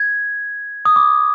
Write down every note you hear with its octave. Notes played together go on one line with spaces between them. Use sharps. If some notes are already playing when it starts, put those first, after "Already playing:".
Already playing: G#6
D#6
D6